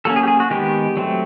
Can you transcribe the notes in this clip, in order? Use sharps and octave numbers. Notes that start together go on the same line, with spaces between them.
F#3 A#3 C#4 A4
G#4
G4
G#4
F#4
D#3 G#3 B3 G4
F#3 A3 C4